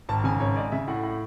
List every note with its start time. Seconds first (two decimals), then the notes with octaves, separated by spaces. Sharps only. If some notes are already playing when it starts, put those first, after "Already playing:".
0.09 G#1 A5
0.24 C#3 G#5
0.40 G#1 C#5
0.56 G#3 D5
0.72 C#3 E5
0.88 A2 F#5
1.03 A2